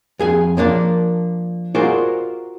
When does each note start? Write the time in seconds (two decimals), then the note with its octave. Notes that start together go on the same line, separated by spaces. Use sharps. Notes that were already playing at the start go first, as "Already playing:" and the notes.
0.19 F2 G#4 G#5
0.57 F3 A#3 D4 D5
1.75 F4 F#4 G#4 A#4 C5 D5